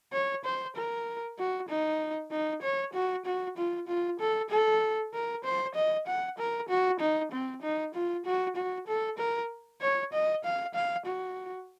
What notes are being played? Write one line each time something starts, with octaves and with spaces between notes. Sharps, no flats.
C#5
C5
A#4
F#4
D#4
D#4
C#5
F#4
F#4
F4
F4
A4
A4
A#4
C5
D#5
F#5
A#4
F#4
D#4
C4
D#4
F4
F#4
F#4
A4
A#4
C#5
D#5
F5
F5
F#4